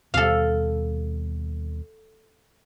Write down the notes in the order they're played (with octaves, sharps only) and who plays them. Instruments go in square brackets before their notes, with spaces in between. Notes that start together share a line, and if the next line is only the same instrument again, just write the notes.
[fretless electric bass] D#2 B2 G3 [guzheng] A4 F5